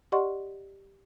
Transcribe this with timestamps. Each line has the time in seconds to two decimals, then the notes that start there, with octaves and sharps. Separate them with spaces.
0.12 G4 D5 D#5 F#5 C6 C#6